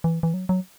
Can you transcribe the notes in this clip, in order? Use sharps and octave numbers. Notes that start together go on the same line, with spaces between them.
E3
E3
F#3
F#3